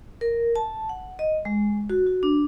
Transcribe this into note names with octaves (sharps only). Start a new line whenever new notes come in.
A#4
A5
F#5
D#5
G#3
F#4
F#4
D4